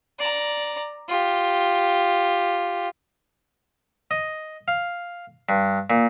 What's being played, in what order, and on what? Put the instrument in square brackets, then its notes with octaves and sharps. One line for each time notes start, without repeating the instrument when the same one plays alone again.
[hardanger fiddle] D5 A#5
F4 G4
[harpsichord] D#5
F5
G2
A#2